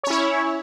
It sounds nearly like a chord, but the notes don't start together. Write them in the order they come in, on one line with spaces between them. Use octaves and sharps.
C#5 C#4 E4